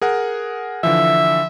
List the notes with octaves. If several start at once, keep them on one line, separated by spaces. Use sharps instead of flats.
G#4 A#4 F#5
D3 E3 F3 E5